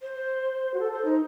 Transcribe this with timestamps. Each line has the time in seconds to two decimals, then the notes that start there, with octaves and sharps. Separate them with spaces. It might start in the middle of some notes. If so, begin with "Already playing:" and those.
0.02 C5
0.74 F#4
0.80 A4
0.92 C5
1.05 D#4